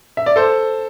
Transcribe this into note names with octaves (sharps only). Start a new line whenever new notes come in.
E5
D5
A4 C5